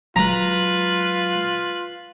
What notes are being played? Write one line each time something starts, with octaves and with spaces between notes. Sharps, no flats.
F#3 G#3 F4 B4 A#5 F#6